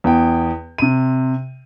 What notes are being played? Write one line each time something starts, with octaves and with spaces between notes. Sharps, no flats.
E2 G5
C3 D#7